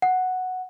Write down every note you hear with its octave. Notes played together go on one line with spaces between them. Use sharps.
F#5